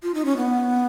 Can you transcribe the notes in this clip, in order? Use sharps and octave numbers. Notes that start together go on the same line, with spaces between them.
F4
D#4
C#4
B3